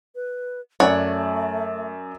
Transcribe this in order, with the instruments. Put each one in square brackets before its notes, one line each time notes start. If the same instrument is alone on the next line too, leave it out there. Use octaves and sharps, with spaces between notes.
[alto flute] B4
[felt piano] F#2 D5 [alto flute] A3 [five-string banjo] C#5 F#5